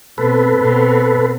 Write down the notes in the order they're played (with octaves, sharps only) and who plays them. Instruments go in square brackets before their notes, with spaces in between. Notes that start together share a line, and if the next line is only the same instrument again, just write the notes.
[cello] B2 C4 [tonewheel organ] A4 B4
[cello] B2 C4